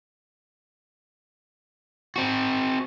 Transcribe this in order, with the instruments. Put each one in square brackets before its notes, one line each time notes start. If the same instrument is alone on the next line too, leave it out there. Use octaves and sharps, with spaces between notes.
[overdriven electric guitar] C4 F#4